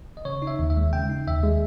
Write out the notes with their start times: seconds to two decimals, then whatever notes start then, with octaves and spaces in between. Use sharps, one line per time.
0.17 D#5
0.25 C#3 C#5
0.42 D#4
0.47 E5
0.59 D#2
0.70 E5
0.76 G#3
0.93 C#3 G5
1.09 D#4
1.27 D#2 E5
1.44 G#3